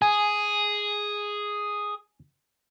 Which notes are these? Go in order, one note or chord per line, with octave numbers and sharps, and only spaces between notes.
G#4 G#5